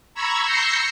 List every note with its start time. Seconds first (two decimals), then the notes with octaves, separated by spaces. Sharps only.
0.14 A#5 B5 C#6 E6 G#6
0.44 E6 G6 A#6 C7 C#7